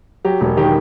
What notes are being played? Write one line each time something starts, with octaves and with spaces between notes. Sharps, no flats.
F#3 G4
E1
D#3 G4